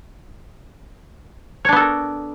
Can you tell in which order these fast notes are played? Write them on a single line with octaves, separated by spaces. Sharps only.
C#5 D4 B3 A4 A#4